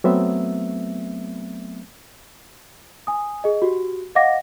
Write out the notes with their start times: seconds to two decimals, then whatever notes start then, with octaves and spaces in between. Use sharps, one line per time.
0.04 F#3 A3 B3 C4 E5
3.07 G#5 D#6
3.44 G#4 D#5
3.62 F#4 G4
4.15 D#5 F5 F#5 D6 A#6